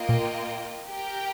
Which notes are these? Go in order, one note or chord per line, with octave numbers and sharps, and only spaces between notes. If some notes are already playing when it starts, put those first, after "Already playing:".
Already playing: A#3 F4 D#5 G5
A#2
G4 A#4 G5